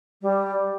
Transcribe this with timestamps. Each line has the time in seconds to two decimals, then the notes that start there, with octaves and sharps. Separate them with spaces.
0.22 G3